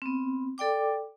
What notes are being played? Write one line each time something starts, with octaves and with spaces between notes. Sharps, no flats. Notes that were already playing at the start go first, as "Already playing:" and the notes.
B3 C4
A4 D5 G5 D6